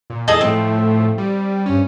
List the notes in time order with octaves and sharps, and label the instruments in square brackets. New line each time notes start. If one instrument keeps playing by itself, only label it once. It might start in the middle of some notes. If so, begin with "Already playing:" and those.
[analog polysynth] A#2
[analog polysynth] E2 G#2 [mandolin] G#4 A4 D#5
[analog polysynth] A2 F3 A3 [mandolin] C4
[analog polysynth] G3
G2 C#4